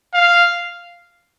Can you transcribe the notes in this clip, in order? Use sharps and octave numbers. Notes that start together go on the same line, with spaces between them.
F5